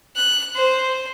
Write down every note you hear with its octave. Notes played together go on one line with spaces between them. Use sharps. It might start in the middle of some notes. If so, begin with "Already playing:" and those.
F#6
C5